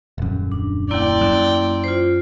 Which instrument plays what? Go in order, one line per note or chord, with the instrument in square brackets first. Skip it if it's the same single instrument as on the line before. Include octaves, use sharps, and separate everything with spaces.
[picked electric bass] D#1 F#2
[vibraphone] D4
[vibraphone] A#3 E4 C6 [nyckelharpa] D5 G5
[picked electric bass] F#2
[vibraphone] F4 C5